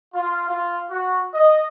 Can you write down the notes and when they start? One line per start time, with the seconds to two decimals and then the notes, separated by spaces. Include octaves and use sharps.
0.14 F4
0.48 F4
0.89 F#4
1.33 D#5